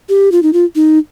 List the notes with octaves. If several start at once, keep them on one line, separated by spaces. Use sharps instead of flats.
G4
F4
D#4
F4
D#4